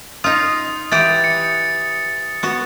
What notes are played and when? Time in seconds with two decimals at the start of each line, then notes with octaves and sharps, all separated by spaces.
0.24 D#4 F4 D#6
0.92 E3 G4 F#5 A6
1.24 C#7
2.43 B3 F#4